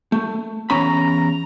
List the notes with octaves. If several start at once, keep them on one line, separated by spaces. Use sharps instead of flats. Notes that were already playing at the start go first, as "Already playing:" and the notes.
A3
E2 C#4 A#5 B5